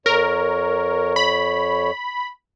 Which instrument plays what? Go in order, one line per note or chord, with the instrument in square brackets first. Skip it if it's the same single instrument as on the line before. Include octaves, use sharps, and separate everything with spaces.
[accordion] F2 C#5 [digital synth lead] A#4
[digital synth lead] B5